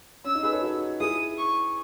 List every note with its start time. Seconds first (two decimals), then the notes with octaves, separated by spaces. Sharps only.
0.24 C#4 E6
0.35 D#4
0.43 G#4 B4
0.53 A4 C#5
0.62 D#4 F#4
1.00 E4 G#4 D#6
1.38 C#6